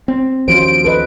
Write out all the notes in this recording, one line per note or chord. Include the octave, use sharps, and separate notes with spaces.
C4
D#2 F3 C#4 F#4 C5 D7
A4 B4 D#5